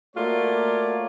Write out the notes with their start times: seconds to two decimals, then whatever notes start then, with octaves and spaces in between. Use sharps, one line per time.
0.16 A3 A#3 F4 F#4 C#5 D5